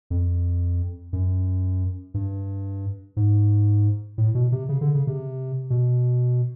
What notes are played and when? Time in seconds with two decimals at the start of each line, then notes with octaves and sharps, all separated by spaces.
0.10 F2
1.13 F#2
2.14 G2
3.16 G#2
4.18 A2
4.35 B2
4.52 C3
4.69 C#3
4.81 D3
4.95 C#3
5.07 C3
5.70 B2